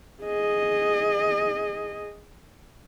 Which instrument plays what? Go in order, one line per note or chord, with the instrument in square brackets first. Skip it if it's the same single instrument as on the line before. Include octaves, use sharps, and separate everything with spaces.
[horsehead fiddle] G#4 D#5